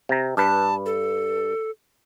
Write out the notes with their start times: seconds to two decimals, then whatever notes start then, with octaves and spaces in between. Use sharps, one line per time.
0.09 C3 A#5
0.37 G2 B4 A5
0.86 A4